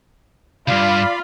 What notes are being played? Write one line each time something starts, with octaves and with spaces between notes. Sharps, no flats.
C#2 G2 F4 D5 F5 B5